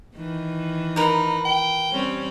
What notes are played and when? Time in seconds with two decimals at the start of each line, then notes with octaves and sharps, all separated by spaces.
0.16 D#3 E3
0.96 D#4 A#4 B4
1.45 G5
1.92 G3 C4 C#4